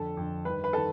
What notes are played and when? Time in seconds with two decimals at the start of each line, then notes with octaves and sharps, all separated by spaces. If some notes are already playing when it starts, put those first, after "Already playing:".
Already playing: F2 D3 A4
0.17 F2 D3
0.45 G2 D#3 B4
0.64 B4
0.73 D#3 A4